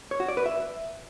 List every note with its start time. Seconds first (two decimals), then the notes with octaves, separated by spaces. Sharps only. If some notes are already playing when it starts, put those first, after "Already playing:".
0.11 C#5
0.20 F#4
0.28 D5
0.37 B4
0.46 E5